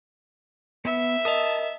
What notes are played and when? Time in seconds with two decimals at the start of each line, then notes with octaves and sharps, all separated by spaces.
0.85 B3 E5
1.25 A#4 D#5 A5 D#6